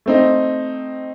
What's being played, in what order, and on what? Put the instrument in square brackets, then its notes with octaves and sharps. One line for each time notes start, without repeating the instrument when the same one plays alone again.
[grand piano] A3 C4 D#4